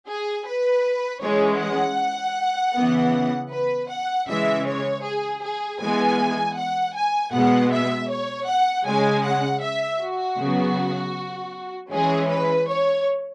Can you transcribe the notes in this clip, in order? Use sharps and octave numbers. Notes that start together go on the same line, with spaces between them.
G#4
B4
E3 G#3 C#4 C#5
F#5
C#3 E3 B3
B4
F#5
C#3 E3 G#3 E5
C#5
G#4
G#4
E3 G#3 B3 G#5
F#5
G#5
B2 G#3 B3 F#5
E5
C#5
F#5
C#3 G#3 C#4 G#5
F#5
E5
F#4
C#3 F#3 B3
E3 G#3 C#4 G#4
B4
C#5